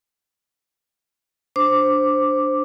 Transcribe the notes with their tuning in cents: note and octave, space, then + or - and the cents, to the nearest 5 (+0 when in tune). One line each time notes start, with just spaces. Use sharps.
D4 +0 C5 +0 D6 +0